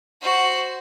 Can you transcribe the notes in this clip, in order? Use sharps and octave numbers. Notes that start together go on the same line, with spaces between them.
F#4 C5